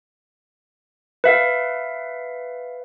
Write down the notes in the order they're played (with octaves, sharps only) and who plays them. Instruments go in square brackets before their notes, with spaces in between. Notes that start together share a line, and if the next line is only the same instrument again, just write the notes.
[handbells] B4 E5 F5